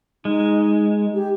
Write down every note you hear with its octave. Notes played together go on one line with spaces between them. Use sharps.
G#3 D#4
G4